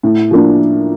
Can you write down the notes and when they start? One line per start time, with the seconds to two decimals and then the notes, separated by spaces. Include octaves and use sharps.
0.03 A2
0.31 F3 A#3 D4